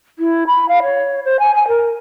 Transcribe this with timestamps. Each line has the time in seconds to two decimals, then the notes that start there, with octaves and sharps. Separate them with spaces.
0.19 E4
0.47 B5
0.68 F5
0.83 C#5
1.25 C5
1.39 G#5
1.55 G#5
1.68 A#4